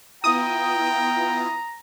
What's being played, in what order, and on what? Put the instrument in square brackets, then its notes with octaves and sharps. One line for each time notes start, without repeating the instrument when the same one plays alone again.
[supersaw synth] B3 E4 F4 [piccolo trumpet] G5 [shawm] A#5 [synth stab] D#6